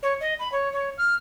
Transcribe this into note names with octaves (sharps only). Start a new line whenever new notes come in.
C#5
D#5
B5
C#5
C#5
F6